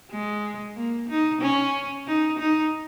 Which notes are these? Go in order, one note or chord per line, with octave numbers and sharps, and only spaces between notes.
G#3
A#3
D#4
C#4
D#4
D#4